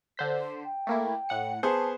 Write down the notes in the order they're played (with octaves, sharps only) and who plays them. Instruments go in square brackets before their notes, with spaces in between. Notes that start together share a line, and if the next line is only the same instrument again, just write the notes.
[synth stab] D3 C5 B6
[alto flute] G5
[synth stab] A3 A#3 E4
A2 F#5 C#7
[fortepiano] B3 G#4 C5 [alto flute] A5 [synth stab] C#6